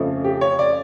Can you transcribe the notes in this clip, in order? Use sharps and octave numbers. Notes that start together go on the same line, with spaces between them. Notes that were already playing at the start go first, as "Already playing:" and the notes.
Already playing: F2 C#3 F3 A3
G4
C#5
D5